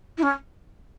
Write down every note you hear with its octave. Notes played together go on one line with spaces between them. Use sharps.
E4
C#4